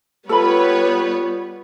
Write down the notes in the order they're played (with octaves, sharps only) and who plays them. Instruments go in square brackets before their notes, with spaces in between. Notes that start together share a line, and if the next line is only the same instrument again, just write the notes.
[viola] G3 B3 [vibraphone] F4 [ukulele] A4 B5 [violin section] B4 C#5